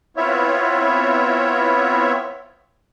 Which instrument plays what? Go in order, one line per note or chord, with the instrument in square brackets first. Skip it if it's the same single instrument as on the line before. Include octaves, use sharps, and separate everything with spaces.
[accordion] B3 C4 E4 F4 C#5 E5